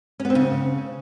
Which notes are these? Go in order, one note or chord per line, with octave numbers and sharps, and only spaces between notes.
C#4
B3
C4
C#3